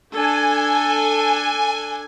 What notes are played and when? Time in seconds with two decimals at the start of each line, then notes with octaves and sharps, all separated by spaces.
0.14 D4 A4 G#5